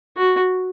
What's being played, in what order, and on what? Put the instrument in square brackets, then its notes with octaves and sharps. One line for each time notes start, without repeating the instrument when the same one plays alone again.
[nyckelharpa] F#4